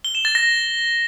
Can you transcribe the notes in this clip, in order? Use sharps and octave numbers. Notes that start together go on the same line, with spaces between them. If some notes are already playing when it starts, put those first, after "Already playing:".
G7
E7
A6
A#6